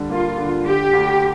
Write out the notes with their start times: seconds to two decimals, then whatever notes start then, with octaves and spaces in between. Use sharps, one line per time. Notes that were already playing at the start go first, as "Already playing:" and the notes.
Already playing: D3 G3
0.10 A#3 F4
0.38 D3
0.65 D3 G4
0.93 D2